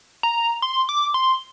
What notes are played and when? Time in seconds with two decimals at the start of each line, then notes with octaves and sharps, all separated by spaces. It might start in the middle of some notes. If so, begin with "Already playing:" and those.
0.23 A#5
0.62 C6
0.89 D6
1.14 C6